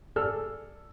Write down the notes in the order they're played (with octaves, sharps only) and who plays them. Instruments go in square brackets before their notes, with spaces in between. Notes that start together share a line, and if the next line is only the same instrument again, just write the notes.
[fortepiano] G#4 A4 D5 E6 F6